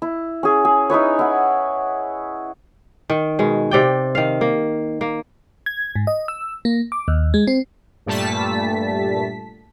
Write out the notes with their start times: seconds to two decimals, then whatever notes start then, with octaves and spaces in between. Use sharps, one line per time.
0.02 E4
0.43 C#4 G#4
0.65 G#4
0.90 D#4 E4 B4 C#5
1.19 E4 F#5
3.10 D#3
3.39 B2 G#3
3.71 C3 D5 G5
4.15 D#3 F5
4.41 A#3
5.01 A#3
5.66 G#6
5.96 G#2
6.07 D#5
6.28 E6
6.65 A#3
6.92 D6
7.08 D#2
7.34 G#3
7.47 C4
8.06 G2 A#2 G3 A3 A5 B6